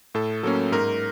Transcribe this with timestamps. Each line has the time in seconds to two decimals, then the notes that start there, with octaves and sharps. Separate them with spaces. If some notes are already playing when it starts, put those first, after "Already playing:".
0.15 A2 A4
0.43 F#3 A#3 C#4 A4
0.72 G#2 A#4